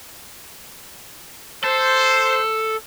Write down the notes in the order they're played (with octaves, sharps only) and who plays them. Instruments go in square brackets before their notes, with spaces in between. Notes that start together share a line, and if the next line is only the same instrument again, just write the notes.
[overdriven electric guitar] A4 [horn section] C5